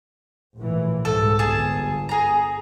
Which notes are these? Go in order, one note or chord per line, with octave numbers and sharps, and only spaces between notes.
A#1 A2 E3
C2 G#2 A4
G1 G#4 A5
G#4 A#5